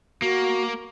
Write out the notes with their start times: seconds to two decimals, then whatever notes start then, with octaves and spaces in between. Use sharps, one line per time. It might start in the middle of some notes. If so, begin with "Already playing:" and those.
0.22 A#3 F#4